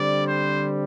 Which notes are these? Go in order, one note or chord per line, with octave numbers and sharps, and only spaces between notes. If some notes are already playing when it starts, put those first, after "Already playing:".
Already playing: D3 G3 C4 D5
C5